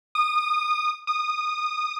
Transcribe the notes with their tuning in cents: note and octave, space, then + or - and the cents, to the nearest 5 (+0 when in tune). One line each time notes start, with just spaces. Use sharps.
D#6 -25
D#6 -20